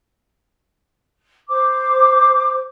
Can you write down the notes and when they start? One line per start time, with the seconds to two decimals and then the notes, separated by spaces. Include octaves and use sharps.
1.49 C5 D6